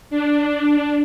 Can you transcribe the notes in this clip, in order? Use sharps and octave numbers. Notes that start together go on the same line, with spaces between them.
D4